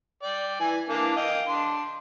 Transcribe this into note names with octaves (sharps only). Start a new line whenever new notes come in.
D5 G5
E3 G#5
E3 A#3 D4
D#5 F5 G5
D4 C6